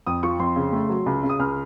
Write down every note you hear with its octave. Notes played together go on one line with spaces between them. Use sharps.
F2 D#6
F3 C#6
F2 C6
C#3
A3
F#3
C#2
C#3
D#6
C#2 F6